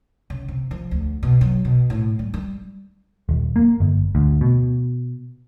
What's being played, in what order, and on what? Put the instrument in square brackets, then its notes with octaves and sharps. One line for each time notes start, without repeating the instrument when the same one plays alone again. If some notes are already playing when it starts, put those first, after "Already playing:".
[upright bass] C#3
C3
F3
D2
B2
F#3
B2
A2
G3
G3
[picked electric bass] D#1
A#3
G1
D2
B2